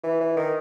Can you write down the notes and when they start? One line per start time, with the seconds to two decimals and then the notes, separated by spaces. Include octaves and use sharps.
0.04 E3
0.21 E3
0.36 D#3